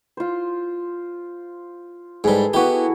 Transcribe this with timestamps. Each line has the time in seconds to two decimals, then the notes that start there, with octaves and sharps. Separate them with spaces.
0.17 F4 C5
2.24 G#2 G3 G#4 A4 B4
2.54 B3 E4 F#4 G4